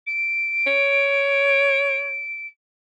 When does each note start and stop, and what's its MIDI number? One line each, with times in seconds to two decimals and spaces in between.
0.06 2.47 98
0.67 2.22 73